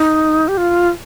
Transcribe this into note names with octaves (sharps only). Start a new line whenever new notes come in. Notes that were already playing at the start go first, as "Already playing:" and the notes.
Already playing: D#4
G4
F4